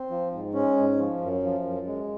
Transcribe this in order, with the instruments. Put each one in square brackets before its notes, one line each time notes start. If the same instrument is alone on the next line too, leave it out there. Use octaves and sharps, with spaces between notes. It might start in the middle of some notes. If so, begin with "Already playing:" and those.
Already playing: [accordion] C4
F3
G#2
G#3 C#4
G#2
F3
F#2
F3
F#2
G#3